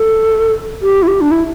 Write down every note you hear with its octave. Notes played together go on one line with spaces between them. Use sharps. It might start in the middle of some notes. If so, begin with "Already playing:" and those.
Already playing: A4
G4
E4
G4
D4
E4